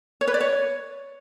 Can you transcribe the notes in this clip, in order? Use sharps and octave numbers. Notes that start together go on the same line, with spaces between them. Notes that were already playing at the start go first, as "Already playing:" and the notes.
C#5
B4
D5
C#5